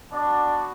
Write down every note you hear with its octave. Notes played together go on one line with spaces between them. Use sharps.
B3 D4 F#4 D5